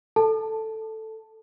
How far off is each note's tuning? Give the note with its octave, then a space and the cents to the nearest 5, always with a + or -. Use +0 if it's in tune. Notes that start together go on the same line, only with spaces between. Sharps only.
A4 +0 A5 +0